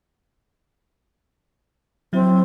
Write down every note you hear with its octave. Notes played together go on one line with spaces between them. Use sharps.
F#3 C4 E4